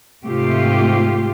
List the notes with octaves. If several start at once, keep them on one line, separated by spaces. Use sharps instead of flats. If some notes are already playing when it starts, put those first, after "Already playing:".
G#2 C3 A3 F4 G4